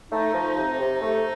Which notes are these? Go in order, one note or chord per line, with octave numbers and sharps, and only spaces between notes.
A3 D#4
F3
C3
C3
A3